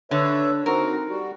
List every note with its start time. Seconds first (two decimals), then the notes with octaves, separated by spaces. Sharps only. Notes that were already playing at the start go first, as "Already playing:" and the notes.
0.11 D3 B4 C#5 E5
0.66 C4 D#4 F#4 A#4
1.09 G3 F#4